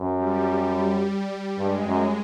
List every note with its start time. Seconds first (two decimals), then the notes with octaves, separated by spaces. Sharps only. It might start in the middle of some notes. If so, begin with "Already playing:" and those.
Already playing: F#2
0.18 G3
1.57 G2 G#3
1.86 F#2